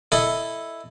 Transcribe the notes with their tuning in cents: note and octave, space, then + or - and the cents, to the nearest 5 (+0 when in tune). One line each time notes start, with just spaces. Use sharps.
E4 +0 A4 +0 D#5 -5